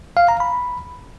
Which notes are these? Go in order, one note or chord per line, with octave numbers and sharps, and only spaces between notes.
F5
A#5
B5